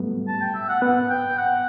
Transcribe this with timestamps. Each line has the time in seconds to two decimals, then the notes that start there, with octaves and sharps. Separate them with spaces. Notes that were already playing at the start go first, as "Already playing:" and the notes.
Already playing: F#3 G3 A3 B3
0.28 A5
0.41 G5
0.55 E5
0.69 F#5
0.82 B3 F#5
1.10 G5
1.38 F#5